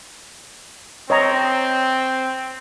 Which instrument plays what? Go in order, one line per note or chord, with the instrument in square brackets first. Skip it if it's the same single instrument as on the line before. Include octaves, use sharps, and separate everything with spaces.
[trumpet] C4 [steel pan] C#5 D#5 A#5